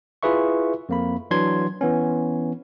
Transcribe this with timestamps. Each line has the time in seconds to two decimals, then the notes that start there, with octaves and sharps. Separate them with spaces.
0.23 E4 F4 G#4 B4 E5 C#6
0.89 F2 A#3 B5
1.31 E3 F#3 D4 C6 G#6
1.81 E3 B3 C#4